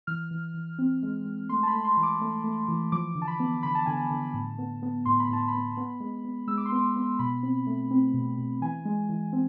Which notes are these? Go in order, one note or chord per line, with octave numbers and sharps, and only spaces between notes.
E3 F6
E3
E3
C4
G#3
G#3
A3 C6
A5
B5
A3
C6
E3
D6
A3
A3
E3
F3 D6
D3
A5
B5
B3
D3 B5
A5
D3 G#5
A5
D3
A2
B3
B3
A2 C6
B5
A2 A5
B5
B3
B3
G#3
B3
G#3 E6
D6
C6
B3 D6
B3
B2 B5
C4
A3
C4
B2
B2
E3 G#5
G#3
E3
C4